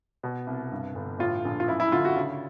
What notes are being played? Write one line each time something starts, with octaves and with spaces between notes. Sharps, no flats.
B2
C2
G2
G1
A2 F4
A#1
F4
F#2 E4
E4
D3 F4
F#4
C#3